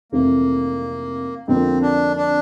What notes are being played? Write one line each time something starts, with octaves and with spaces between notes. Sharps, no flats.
F1 F2 E3 A3 A#3 C4
F2 D3 F3 A#3 C4
D4
D4